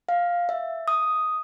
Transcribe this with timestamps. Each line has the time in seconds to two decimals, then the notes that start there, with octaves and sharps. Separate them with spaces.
0.09 F5
0.49 E5
0.88 D#6